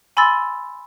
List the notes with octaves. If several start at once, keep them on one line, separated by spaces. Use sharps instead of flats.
G#5 B5 C6 E6 A6